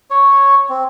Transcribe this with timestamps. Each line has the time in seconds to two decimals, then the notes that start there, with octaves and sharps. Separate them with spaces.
0.10 C#5
0.69 C4